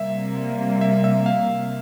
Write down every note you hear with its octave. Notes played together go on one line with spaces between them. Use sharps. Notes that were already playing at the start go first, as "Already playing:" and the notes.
Already playing: C3 G3 A#3 E5
E5
E5
F5